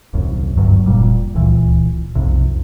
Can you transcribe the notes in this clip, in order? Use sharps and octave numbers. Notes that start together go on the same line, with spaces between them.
D#1 C2 F#2
G1 D2 G2 F#3
F1 A#2 G3
D1 C#2 A#2 E3
B1 F2 C3